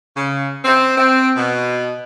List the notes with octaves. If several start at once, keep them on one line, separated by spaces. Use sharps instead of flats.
C#3
C4
C4
B2